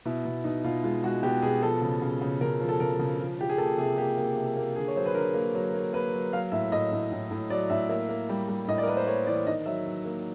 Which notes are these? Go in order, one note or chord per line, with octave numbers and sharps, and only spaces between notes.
B2 E4
B2
B2 D#4
B2 F4
G#3 F4
G#3 F#4
B2 G4
B2 G#4
F3 A4
C#3
C#3
C#3
C#3 A#4
F3
A4
C#3 A#4
C#3
F3
F3 G4
G#4
A#3 A4
C3 G#4
A#3 G4
A#3
C3
A#3
D3 G#4
C#5
F#3 C5
B4
D3 A#4
A#3
F#3
A#3
A#3 B4
F#3
F#3 F5
A2 E5
A2 D#5
A2
A2
A2
F#3 D5
A2 E5
A#3 E5
A#3
G3
G3
A2 D#5
D5
A#4
A#3 B4
C5
A#3 C#5
E3 D5
D#3 D#5
F#3 E5
F#3
A#3